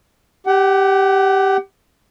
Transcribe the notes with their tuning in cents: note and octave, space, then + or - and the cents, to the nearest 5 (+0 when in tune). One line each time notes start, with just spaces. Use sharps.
G4 +0 F#5 +35